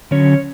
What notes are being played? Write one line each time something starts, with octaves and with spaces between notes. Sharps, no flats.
D3 F#3 C#4 C#5